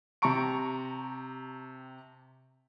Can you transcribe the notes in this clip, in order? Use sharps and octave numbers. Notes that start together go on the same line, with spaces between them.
C3 G4 A5 A#5 C#6 D7